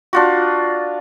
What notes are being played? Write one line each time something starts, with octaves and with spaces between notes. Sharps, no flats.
D4 F4 F#4